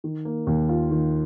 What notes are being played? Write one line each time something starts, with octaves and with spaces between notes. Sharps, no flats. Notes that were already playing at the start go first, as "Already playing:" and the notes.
D#3
A#3
D#2
F4
D#3